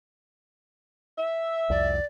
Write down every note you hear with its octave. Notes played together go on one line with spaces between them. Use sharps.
E5
C2 F2 D5